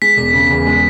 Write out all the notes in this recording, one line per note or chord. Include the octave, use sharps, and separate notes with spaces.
G#3 B6
E1
C#3
E2
G#3